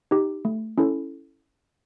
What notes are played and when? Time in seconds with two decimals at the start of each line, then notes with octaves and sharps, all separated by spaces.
0.11 D#4 G4
0.45 A3
0.78 C#4 E4 A4